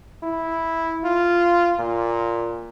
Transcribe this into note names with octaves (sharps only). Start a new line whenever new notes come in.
E4
F4
A#2